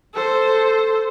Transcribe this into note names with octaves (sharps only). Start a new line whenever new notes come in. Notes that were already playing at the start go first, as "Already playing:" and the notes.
A4 C5